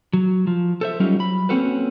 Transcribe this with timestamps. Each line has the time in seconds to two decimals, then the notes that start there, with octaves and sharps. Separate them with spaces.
0.13 F#3
0.47 F3
0.81 A4 C5 E5
1.00 F#3 G3 C#4 D#4 F4 G4
1.16 F#3 B5
1.49 A#3 C4 C#4 F#4 A4 B4